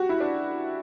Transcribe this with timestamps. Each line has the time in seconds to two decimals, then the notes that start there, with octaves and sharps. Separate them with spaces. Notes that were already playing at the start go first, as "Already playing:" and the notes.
Already playing: F#4 G4
0.09 E4
0.20 D4